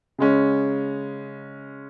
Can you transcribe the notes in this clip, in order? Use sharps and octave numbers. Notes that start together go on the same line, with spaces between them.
C#3 G#3 C#4